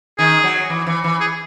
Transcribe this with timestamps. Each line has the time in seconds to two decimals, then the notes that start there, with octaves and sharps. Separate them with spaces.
0.18 D#3 G#4
0.44 F#3
0.70 E3
0.87 E3
1.04 E3
1.20 G#4